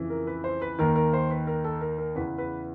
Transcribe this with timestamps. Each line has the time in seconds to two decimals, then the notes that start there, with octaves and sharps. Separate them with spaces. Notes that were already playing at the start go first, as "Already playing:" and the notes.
Already playing: F2 C#3 E3
0.10 A#4
0.27 B4
0.44 C5
0.62 B4
0.79 D#2 D#3 A#4
0.96 A#4
1.13 C5
1.31 B4
1.47 A#4
1.64 A4
1.81 A#4
1.99 A#4
2.16 E2 C#3 E3 B4
2.38 B4